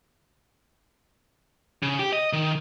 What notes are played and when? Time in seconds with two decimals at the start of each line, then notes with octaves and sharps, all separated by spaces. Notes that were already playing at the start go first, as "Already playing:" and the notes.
1.83 C#3
1.99 G4
2.13 D#5
2.33 D#3